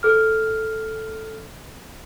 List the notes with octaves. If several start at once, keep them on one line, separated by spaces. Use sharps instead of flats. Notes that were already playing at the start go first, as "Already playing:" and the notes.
A4 F6